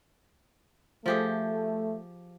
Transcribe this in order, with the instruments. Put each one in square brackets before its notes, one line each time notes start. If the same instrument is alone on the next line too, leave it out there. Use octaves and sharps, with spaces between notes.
[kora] F3 G4 G#4 [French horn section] A3